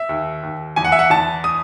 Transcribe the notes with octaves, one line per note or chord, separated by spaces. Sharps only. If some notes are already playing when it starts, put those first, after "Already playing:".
Already playing: E5
D#2
D#2
E2 G#5
F#5
E5
F#5
E2 A5
D#6